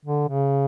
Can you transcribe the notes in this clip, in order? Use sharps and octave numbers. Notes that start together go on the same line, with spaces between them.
D3
C#3